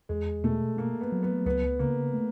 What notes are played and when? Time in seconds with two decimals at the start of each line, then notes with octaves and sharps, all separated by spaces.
0.09 E2 G#3
0.44 B2 A3
0.77 A3 A#3
1.01 B3
1.12 F#3
1.23 B3
1.46 C#2 B3
1.79 C#3 A#3
2.13 A3